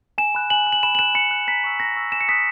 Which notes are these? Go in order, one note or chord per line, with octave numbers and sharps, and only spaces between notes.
G#5 E7
B5 F#6
G#5 F#7
B5 F#6
F#7
B5 E7
F#7
F#6 E7
B5 C#7
F#6
A#5 B6
C#6 E6
A#5 A#6
C#6 E6
G#5 E7
C#7
D#6 F#6 B6